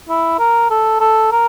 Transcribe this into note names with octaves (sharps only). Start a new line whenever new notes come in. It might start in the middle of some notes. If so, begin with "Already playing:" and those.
E4
A#4
A4
A4
A#4